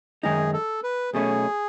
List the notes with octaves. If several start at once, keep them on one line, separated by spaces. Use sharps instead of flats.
F#2 D#3 G#3 D#4 G#4
A4
B4
B1 B2 A3 C#4 G#4